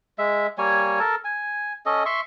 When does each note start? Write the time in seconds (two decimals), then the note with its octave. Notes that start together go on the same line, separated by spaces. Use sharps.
0.18 G#3 E5
0.58 G3 A#3 C#5 G#5
0.99 A4 A#4 A5
1.24 G#5
1.86 C#4 A4 D#5
2.06 E5 C6 C#6